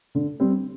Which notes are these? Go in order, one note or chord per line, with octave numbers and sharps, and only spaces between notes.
D3
G3 C4